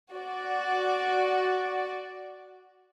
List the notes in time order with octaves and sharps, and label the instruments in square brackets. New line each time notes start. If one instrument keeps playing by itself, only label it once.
[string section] F#4 D5